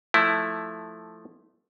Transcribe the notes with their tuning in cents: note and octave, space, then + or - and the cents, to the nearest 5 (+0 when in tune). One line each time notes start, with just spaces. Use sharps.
F3 +5 A3 +0 E4 +0